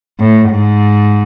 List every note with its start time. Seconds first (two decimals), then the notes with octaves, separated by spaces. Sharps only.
0.20 A2
0.50 G#2